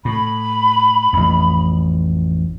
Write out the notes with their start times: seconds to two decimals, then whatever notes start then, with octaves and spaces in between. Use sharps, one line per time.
0.05 A2 B5
1.13 A1 F2